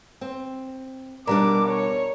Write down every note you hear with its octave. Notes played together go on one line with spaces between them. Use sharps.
C4
B2 G3 D4 A#4 D5 A#5 D6
C#5